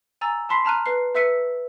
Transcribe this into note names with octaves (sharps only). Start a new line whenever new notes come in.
G#5 A#5 E6 A6
A5 B5 C6 B6 C7
A5 A#5 F6 F#6 D#7
B4 C7
B4 E5 E6 B6 C#7 D#7